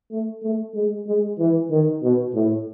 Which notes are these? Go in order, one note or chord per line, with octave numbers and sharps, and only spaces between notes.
A3
A3
G#3
G#3
E3
D#3
B2
A2